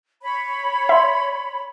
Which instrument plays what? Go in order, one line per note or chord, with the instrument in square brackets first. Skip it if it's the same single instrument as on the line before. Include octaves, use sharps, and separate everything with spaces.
[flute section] C#5 B5
[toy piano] D5 C6 [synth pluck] E5